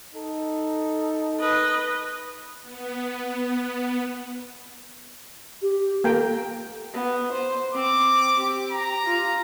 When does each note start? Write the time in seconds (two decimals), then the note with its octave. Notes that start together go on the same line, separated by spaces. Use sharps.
0.14 D#4 A4
1.40 B4 D#5
2.62 B3
5.62 G4
6.04 A#3 A4 G5 A#5
6.93 B3
7.33 C5
7.74 C4 D6
8.38 G4
8.72 A#5
9.06 F4